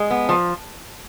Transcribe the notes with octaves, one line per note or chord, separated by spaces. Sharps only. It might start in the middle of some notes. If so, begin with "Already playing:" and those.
Already playing: G#3
B3
F3